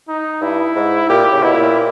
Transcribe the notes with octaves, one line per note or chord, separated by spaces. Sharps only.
D#4
G2 E4
G#2
A#2 G4
C#3
B2 E4
A#2